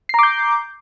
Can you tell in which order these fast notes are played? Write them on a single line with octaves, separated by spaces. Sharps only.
C7 A#5 D6 G6